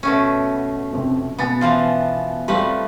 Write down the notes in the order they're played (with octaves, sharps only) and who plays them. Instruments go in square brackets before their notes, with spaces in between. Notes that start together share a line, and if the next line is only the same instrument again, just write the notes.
[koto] B2 A3 C#4
[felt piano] F2 C3 C4
[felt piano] B2 G#5 A6 [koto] B3
[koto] E3 F3 F4
[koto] F3 A3 B4 [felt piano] G3 C4